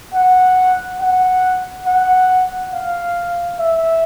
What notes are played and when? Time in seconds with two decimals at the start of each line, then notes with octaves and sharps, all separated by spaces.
0.14 F#5
1.00 F#5
1.86 F#5
2.73 F5
3.59 E5